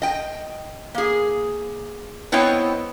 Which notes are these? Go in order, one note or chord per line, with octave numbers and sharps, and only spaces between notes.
D#5 G5
A#3 G#4
B3 C4 E4 C#5 D#5 G5